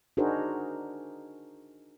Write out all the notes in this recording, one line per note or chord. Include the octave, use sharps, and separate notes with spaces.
D4 D#4 F#4 G#4 A#4 C5